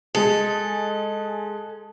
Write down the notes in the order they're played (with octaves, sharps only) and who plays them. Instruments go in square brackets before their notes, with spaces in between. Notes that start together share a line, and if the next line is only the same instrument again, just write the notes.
[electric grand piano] G#3 G#4 [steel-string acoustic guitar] A4